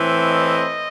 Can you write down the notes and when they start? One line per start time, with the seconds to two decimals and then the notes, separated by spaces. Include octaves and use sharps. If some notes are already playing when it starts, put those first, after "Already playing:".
Already playing: A2 E3 C4
0.22 D#5